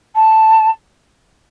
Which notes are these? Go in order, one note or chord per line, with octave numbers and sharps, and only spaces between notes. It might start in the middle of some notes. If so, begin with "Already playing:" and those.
A5